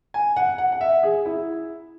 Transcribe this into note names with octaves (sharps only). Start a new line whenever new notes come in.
G#5
F#5
F#5
F#5
E5
G#4
E4